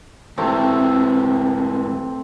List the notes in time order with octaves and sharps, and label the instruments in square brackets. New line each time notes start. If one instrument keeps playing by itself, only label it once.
[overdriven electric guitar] G#2 E3 [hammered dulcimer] C3 A3 C4